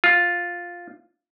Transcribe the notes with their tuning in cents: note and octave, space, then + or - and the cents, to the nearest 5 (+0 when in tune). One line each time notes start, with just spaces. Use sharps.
F4 +5